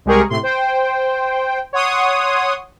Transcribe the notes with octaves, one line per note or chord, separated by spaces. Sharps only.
C2 G#3 G4 G#4 A#4 C#6
A2 C3 C6
C5 G5
C#5 F#5 C6 D#6